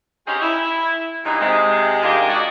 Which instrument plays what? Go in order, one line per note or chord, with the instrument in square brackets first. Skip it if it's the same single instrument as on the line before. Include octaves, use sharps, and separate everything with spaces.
[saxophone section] G#3 C4 C#4 D#4 G4 G#4
E4
G2 A#2 E3 F#3 D#4
C3 G#3
F3 G#3 A#3 D4 D#4 G4
F#4 D5 D#5